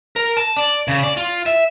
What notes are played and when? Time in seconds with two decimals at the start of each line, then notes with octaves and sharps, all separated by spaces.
0.16 A#4
0.37 A5
0.57 D5
0.88 C#3
1.03 D5
1.17 F4
1.46 E5